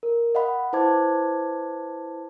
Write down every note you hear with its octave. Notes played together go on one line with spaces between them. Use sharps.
A#4
D#5 F5 F#5 B5
E4 B4 C5 A5 D6 G#6